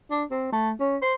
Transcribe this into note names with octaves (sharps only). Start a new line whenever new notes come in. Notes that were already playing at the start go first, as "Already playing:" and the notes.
D4
C4
A3
C#4
C5